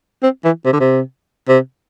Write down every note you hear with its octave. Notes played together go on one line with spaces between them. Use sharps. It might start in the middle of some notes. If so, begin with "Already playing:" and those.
C4
E3
C3
D3
C3
C3